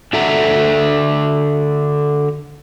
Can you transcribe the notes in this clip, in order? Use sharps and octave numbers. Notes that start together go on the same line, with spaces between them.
D3 F#4 A4 E5 F#5 A#5